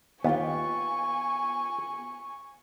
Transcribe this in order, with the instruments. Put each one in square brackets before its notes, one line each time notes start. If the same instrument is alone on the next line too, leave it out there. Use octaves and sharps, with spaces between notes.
[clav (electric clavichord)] D#2 [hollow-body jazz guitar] B3 F4 G4 [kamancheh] G#5 C#6